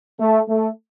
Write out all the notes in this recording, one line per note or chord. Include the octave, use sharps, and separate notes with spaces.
A3
A3